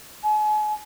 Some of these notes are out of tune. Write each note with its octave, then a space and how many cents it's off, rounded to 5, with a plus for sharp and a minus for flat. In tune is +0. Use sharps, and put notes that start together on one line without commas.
G#5 +40